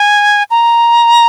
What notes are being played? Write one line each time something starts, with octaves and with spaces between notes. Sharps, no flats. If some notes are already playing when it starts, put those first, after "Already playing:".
Already playing: G#5
A#5